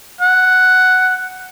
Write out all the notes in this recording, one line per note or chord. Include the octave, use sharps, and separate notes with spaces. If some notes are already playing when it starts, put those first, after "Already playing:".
F#5